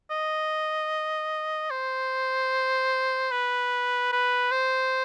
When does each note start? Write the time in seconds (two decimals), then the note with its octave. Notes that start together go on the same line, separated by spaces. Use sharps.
0.10 D#5
1.70 C5
3.31 B4
4.12 B4
4.51 C5